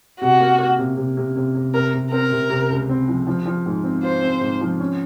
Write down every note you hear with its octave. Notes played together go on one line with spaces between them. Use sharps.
C3 F#4
A#3
A#3
C3
C3
C3
C3
C3
C3 A#4
C3
C4 A#4
C3
C3
C#2
C4
F3
F3
F3
G#2
C4
F4 C5
C4
G#2
F3
C#4